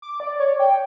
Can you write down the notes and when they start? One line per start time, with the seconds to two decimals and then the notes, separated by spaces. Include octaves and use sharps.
0.02 D6
0.20 D5
0.40 C#5
0.59 G5